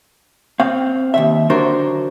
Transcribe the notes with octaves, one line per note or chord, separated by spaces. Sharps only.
C4 F5
D#2 B2 E5
D3 F#3 D4 F#4 A#4 C5